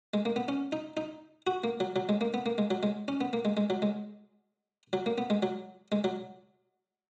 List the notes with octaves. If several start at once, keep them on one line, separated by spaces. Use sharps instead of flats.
G#3
A#3
B3
C#4
D#4
D#4
F#4
A#3
F#3
F#3
G#3
A#3
B3
A#3
G#3
F#3
G#3
C#4
B3
A#3
G#3
G#3
F#3
G#3
F#3
A#3
B3
G#3
F#3
G#3
F#3